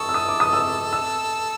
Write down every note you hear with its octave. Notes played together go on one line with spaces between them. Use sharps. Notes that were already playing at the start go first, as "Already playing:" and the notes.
Already playing: A4 C#6 D#6
E6
D#6
D6
D#6
E6
E6